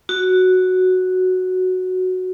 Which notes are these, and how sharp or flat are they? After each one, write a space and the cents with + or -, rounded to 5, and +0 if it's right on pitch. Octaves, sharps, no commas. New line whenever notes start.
F#4 +0